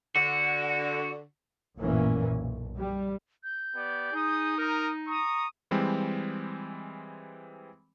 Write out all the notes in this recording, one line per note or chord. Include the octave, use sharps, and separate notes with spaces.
D3 F#4
A1 F#2 A#2 E3 A#3 C#4
B1
G3
G6
B3 G4 D5
D#4 G#4 D#6
A#4 A#5 D#6
A#5 C#6 D#6
E3 G3 G#3 C4